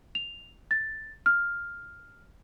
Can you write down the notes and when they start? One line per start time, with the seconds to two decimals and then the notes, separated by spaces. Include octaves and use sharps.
0.15 F7
0.71 A6
1.26 F6